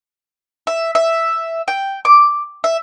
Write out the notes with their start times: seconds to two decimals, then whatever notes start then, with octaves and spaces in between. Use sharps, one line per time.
0.67 E5
0.95 E5
1.68 G5
2.05 D6
2.64 E5